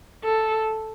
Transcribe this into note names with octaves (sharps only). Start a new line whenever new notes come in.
A4